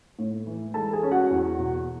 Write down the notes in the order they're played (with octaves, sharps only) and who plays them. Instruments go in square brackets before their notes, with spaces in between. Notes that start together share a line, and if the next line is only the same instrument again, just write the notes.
[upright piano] A2
E3
G#3 A4 A5
G#4 G#5
C#4
F#4 F#5
E2
B2